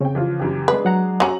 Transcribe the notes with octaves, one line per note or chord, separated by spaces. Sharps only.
C#3 C4 C#4 G5
E3 F3 F4
F#2 E3 G4
G#3 D4 G#4 B4
F#3 F#5 A#5
F#3 C#4 A#5 F#7